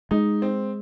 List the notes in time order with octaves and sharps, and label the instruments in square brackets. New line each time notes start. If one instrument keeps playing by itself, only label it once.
[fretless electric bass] G#3 [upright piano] D#4
[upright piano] C4